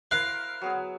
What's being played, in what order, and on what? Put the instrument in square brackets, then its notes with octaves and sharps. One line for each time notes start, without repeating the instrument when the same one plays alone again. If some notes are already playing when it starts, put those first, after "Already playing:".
[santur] E4 A#4 C5 [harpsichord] F5 [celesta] F#6
[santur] F#3 B3 G#4